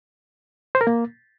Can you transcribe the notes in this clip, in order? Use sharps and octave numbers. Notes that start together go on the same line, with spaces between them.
C5
A#4
A#3